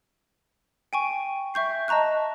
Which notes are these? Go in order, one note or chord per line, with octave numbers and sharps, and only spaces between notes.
G5 G#5 C#6
E5 C#6 G6 C7
D#5 A5 A#5 C#6 F#6